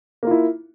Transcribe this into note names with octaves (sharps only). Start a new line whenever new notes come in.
A#3 E4 F4